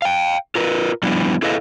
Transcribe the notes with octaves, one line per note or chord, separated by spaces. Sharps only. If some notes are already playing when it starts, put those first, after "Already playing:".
F5 G5
F4 A#4 B4
F3 G3 B3 D4 E4
E4 G#4 A4 B4 D#5 F5